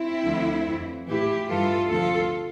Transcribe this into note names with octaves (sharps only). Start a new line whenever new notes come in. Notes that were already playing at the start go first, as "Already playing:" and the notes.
Already playing: C4 E4
D2 D3 F3
F2 E3
A2 E3 E4 G4
G2 E3 F4 A4
D2 C3 F3 F4 A4